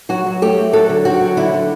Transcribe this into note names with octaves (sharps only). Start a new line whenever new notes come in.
F#3 F#4
F#3
A3 G4
C4
F#3 A4
D3
C4 F#4
F#3
D3 E4
D3